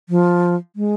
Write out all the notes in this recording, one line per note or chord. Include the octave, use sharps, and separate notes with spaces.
F3
G#3